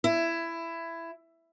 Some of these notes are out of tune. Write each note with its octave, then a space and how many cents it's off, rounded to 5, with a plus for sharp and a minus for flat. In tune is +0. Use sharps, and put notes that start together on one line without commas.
E4 +15